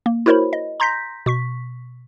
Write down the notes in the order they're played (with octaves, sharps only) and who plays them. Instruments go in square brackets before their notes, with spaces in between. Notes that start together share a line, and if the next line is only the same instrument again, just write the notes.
[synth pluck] A#3
E4 F#4 A#4 C5 C#5 B5
D#5
A#5 C6 G6 A#6 B6
B2 C#6 B6